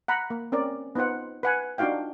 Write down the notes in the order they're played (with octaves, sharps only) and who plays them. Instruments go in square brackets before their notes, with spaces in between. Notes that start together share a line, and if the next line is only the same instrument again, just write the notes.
[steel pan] F#5 A#5 B5
A#3
C4 C#4 A#4 D5
B3 D#4 F4 C5 F#5
B4 F#5 G#5
D4 D#4 F4 F#4 F5 G5